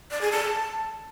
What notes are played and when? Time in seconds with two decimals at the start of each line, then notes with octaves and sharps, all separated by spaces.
0.11 D5
0.21 G#4
0.32 A5